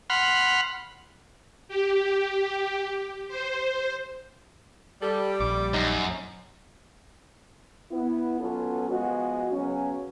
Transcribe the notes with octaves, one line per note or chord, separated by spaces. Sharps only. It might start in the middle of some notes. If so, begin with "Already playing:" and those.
F#5 B5 C6 F6
G4
C5
G3 A4
A#1 D6
F#2 D#4
B3 E4
B2 F#3 B3 C#4 F4 A4
F3 G#3 B3 F#4
C#3 F#3 B3 C#4